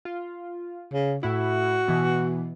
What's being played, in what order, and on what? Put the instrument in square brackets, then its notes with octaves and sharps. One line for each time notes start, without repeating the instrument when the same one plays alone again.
[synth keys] F4
[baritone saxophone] C#3
[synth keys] A2 E4 [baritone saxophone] F#4
[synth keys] B2 E3 B3